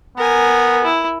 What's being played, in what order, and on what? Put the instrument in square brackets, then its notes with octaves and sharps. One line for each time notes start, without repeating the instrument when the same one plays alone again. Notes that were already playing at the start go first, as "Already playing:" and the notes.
[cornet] B3 [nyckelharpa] A#4 G#5
[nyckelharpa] E4